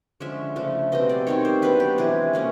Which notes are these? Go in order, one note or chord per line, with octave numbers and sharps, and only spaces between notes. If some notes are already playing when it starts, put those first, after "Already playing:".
D3 F3 G#3 C#4 E5
C#3 F3 A3 D4
B2 G3 C4 D#5
D5
D#3 G3 C4 C#5
C5
F#3 B3 D4 B4
G4
C3 E3 G#3 G#4
F#3 A#3 C#4